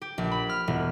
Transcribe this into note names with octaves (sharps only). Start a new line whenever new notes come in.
G4
A#1
B5
F6
E1